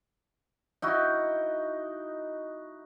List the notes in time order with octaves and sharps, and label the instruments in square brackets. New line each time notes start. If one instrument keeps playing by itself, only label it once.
[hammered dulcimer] D#4 E4 F#4